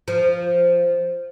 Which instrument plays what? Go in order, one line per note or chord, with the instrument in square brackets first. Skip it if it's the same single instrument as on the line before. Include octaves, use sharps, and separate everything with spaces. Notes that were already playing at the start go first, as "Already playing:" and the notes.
[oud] F3